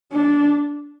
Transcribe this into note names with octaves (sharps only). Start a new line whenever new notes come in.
D4